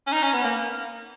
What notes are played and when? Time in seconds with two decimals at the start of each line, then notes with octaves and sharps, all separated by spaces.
0.07 C#4
0.12 D#4
0.23 C#4
0.33 B3
0.44 A#3